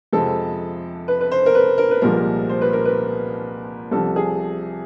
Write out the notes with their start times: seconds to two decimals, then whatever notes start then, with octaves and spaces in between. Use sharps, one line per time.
0.13 F2 C3 F3 G#3 A4
1.08 B4
1.21 B4
1.32 C5
1.46 A#4
1.55 B4
1.78 A#4
1.91 B4
2.02 C2 A#2 F3 G#3 A#4
2.49 C5
2.61 B4
2.73 A#4
2.85 B4
3.91 C2 C3 F3 A4
4.16 G#4